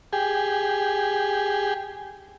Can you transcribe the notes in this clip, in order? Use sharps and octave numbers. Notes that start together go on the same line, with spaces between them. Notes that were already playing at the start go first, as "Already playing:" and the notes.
G4 G#4